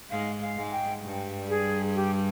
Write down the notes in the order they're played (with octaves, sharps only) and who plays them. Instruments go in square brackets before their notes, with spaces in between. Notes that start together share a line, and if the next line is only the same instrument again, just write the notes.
[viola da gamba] G#2 G#3 [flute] F5
[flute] F5
[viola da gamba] G#2 G#3
[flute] G5
[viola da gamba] G2 G3
[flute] G#4
G4